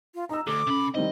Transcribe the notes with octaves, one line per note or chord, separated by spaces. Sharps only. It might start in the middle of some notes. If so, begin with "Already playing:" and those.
F4
D#4 A#5 E6
D2 A4 D6
C3 C#4 B5
D#3 G3 C4 D#4 D#5